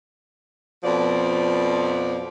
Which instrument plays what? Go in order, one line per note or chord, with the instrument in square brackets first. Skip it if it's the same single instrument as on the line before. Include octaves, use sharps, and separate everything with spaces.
[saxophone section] F2 B2 F3 D5